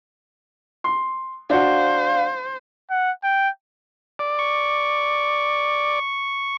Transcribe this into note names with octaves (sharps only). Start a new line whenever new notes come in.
C6
D4 F#4 C5 F5
F#5
G5
D5
C#6